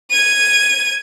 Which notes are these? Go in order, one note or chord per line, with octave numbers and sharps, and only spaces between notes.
G#6 D#7